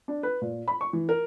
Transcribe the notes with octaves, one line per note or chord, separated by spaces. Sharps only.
D4
B4
A#2
B5
C#6
E3
A#4